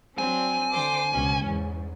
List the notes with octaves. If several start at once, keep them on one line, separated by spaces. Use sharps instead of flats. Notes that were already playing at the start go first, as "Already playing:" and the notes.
F#3 C4 D4 G#5
D3 C5 D6
C#2 B2 C#4
E2 G#2